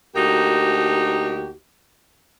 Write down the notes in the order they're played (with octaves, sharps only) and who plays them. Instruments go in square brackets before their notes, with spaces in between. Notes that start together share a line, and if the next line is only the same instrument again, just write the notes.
[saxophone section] D2 A#3 D#4 F#4 G4